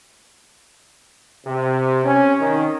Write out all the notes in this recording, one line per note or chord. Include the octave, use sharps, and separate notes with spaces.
C3
C#4
D#3